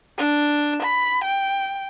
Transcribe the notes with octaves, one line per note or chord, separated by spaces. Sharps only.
D4
B5
G5